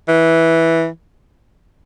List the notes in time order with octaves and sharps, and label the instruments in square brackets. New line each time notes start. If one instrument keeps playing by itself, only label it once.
[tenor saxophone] E3